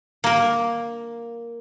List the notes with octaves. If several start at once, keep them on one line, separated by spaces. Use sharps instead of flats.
A#3 A#4